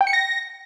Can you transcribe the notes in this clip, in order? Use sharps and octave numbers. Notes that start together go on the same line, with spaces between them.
G5
C#7
A#6